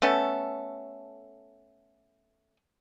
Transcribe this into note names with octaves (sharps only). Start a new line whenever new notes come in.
A3 B3 C#4 A4